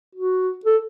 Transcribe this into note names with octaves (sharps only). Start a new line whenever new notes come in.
F#4
A4